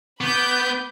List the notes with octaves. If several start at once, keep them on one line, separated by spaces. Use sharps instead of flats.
B3 B5 D6 G6